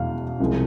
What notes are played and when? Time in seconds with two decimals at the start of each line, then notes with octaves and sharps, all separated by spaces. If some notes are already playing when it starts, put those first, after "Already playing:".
Already playing: E2 B2 G#3 F5
0.40 C2 C3 F3 G#3